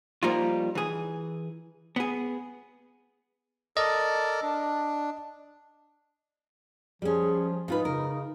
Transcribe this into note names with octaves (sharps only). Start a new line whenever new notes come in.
F3 G3 A#3 D#4 F4
E3 G#4
B3 G#4
A4 A#4 D5 D#5
D4
F3 G3 C#4 G#4
G#2 D#4 F4 B4
C#3 A#4